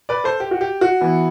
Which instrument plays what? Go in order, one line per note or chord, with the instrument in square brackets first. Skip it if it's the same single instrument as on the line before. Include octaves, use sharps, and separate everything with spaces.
[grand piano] B4 D5
A4 C5
G4
F#4
G4
F#4
E3 B3 E4